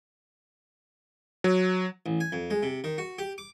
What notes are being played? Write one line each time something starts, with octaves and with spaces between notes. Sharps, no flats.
F#3
A1
G#5
F2
G#3
C3
D#3
F#4
G4
D6